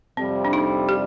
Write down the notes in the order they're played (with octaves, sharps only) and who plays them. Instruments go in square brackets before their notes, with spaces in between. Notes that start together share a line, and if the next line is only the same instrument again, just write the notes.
[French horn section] F2 C3 G3 [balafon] C4
[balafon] D4
D#4
G4